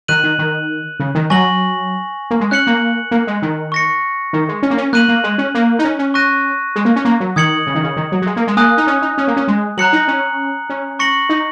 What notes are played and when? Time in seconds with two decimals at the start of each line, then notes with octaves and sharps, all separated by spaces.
0.08 D#3 F#6 D#7 F#7
0.24 D#3
0.39 D#3
1.00 C#3
1.15 D#3
1.30 F#3 G#5 C#6 A#6 F#7
2.31 A#3
2.41 G#3
2.51 C#4 F#6 C#7 F#7
2.67 A#3
3.11 A#3
3.27 G#3
3.42 D#3
3.72 C#6 A#6 C#7
4.33 D#3
4.49 G#3
4.63 C#4
4.70 A#3
4.78 C#4
4.93 A#3 F#6 D#7 F#7
5.08 A#3
5.24 G#3
5.38 C#4
5.55 A#3
5.79 D#4
5.84 C#4
5.99 C#4
6.14 C#6 F#6 A#6 D#7
6.76 G#3
6.85 A#3
6.96 C#4
7.05 A#3
7.20 F#3
7.36 D#3 D#6 G#6 C#7 F#7
7.67 C#3
7.75 D#3
7.84 C#3
7.97 D#3
8.12 F#3
8.22 F#3
8.26 G#3
8.36 A#3
8.47 G#3
8.57 A#3 G#5 D#6 F#6
8.77 D#4
8.87 C#4
9.02 D#4
9.18 C#4
9.28 A#3
9.37 C#4
9.48 G#3
9.77 F#3 A#5 F#6 C#7 F#7
9.93 D#4
10.08 C#4
10.70 C#4
10.99 C#6 A#6 C#7 F#7
11.29 D#4